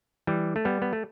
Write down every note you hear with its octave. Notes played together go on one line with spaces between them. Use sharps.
E3 G3
A3
G3 B3
B3
A3